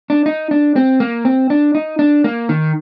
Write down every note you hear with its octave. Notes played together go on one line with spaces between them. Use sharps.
D4
D#4
D4
C4
A#3
C4
D4
D#4
D4
A#3
D#3